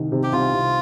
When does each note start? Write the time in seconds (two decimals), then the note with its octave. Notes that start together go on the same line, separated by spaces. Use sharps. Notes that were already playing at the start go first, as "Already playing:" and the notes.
Already playing: C2 D#3
0.12 C3
0.23 G4
0.32 C2 F4
0.54 C2